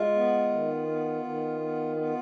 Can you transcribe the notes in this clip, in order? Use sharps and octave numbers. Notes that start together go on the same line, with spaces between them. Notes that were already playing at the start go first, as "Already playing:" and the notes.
Already playing: G#3 F4
B3
D#3
B3
D#3
B3
B3 F4